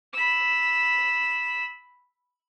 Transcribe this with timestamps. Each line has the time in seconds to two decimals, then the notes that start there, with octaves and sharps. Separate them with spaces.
0.13 B5 E6